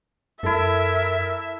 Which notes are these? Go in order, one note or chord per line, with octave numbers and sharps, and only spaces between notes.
F#2 E4 A4 A#4 E5